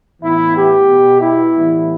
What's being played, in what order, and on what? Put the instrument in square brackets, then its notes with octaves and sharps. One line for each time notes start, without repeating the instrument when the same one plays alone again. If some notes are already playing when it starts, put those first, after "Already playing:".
[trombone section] A2 E3 B3 E4
G4
B2 B3
E4
A2 E3 G3 B3